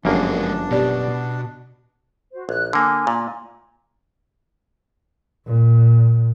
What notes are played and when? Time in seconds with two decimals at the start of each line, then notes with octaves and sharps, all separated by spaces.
0.05 G1 F#2 F3 G#3 A#3 D4 G#4
0.70 B2 B3 G4 D5
2.32 F#4 C5
2.49 A#1 F#6
2.73 D3 A#3 G#5
3.07 A#2
5.46 A#2